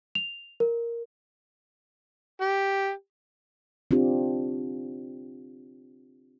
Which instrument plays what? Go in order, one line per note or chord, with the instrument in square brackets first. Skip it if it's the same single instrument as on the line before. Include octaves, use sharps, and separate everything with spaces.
[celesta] F7
A#4
[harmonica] G4
[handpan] C4 D4 F4 G4